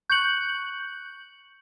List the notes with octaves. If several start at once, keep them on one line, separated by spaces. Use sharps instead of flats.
C#6 F#6 G6 C#7 F#7